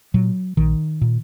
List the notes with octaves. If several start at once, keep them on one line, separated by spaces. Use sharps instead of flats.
A#2 F#3
A#1 D#3
A#2